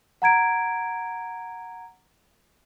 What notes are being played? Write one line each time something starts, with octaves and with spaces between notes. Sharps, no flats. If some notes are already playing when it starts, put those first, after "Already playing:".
F#5 A#5 G#6 D7